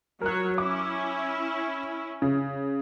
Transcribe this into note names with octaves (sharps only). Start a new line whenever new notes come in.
F#3 A#4 C#5 F#6
C#4 E4 D6
C#3